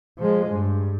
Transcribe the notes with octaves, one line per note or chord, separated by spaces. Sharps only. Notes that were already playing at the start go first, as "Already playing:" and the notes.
F3 G#3
G2